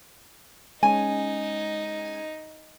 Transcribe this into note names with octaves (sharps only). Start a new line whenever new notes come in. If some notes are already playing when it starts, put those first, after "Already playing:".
G#3 C#4 D#4 G#5